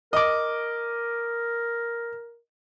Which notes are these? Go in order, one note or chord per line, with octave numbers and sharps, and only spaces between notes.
A#4 D#5 D6